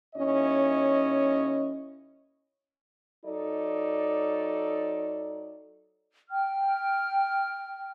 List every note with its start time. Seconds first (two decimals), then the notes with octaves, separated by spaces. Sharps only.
0.16 D#2 C#4 E4 C#5 D#5
3.25 F#3 D#4 A4 D5
6.29 G5 F6